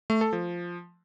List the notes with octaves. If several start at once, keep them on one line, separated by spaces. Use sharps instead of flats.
A3
A4
F3